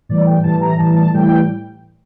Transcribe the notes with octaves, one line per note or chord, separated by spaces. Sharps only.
A2 E3 G3 D5
G5
A2 E3 G3 A5
A#5
A2 E3 G3 A5
A5
A2 E3 G3 G5